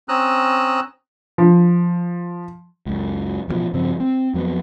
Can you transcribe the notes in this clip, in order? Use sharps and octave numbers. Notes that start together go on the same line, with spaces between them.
C4 C#4 A#5 D#6 E6 F#6
F3
C#2 F#2
A1 G2 B2 F3
G2 C#3 F3 C4
C4
F2 F#3 A#3 B3